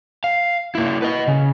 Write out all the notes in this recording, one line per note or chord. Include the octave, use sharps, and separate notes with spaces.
F5
A#3 E4
B4 D#5
C#3